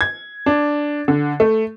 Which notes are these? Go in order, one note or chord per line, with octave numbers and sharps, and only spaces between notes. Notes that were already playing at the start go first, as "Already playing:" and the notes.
G#6
D4
D3
A3